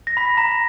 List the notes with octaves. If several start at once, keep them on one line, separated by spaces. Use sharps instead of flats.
A#6
B5 B6
A#5 A#6